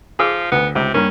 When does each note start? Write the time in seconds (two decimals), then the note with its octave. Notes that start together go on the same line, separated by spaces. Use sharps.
0.19 F3 G#4 D6 E6
0.52 D2 B3
0.75 C#2 C3
0.94 G2 A#3 C#4